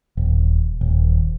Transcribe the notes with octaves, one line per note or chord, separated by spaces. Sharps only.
D#1
D#1